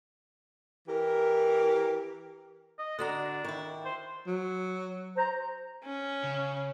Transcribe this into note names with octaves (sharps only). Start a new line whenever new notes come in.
E3 G4 A#4
D#5
D3 D4 F#4 A#5
D#3 E4
C5
F#3
C5 A#5
C#4
C#3